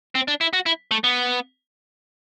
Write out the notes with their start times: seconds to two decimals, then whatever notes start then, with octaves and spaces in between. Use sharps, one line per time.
0.15 C4
0.28 D4
0.41 E4
0.53 F#4
0.66 E4
0.91 A3
1.04 B3